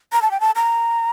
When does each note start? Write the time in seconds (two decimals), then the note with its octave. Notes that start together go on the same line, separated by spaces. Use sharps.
0.13 A#5
0.22 A5
0.31 G5
0.40 A5
0.56 A#5